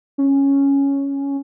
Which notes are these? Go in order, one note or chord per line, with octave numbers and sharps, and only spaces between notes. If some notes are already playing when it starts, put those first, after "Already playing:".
C#4